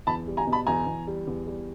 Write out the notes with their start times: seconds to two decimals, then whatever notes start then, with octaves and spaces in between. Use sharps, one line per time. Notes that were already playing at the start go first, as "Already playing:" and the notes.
0.07 E2 A5 B5
0.27 G3
0.37 G#5 A#5
0.47 B2
0.52 A5 B5
0.67 E2 G#5 A#5
0.86 E2
1.07 G3
1.27 E2
1.47 G3